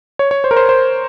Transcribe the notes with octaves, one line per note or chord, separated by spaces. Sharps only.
C#5
C#5
C5
A#4
C5
C5